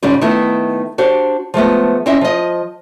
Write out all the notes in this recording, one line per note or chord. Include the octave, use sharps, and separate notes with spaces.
G#2 D3 G3 C#4 D#4
D#3 A3 B3 E4
D4 F#4 G4 C5
F3 G#3 A3 B3
C4 C#4 E4 D#5 E5
F3 D#5